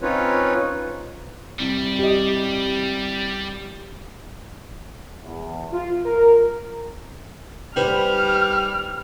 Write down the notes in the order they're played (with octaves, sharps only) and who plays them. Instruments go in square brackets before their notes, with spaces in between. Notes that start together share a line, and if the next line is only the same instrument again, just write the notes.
[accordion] C4 C#4 D#4 F4 B4 C#5
[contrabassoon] C2 [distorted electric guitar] G3
[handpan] G4 D#5
[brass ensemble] E2
F4
A#4
[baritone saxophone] G3 [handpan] D#4 B4 C5 [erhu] F6